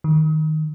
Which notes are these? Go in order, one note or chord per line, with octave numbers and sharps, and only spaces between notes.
D#3